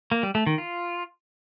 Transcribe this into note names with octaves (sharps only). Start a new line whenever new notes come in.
A#3
G3
A3
D#3
F4